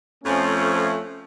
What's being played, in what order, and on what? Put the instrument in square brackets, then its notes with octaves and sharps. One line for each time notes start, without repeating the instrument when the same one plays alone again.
[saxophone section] F2 F3 [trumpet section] A3 C#4